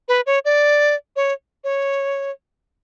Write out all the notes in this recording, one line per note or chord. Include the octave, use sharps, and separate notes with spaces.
B4
C#5
D5
C#5
C#5